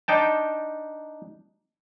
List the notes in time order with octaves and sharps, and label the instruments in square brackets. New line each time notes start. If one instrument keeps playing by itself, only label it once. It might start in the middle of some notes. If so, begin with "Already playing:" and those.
[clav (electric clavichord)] D4 D#4 G5 A5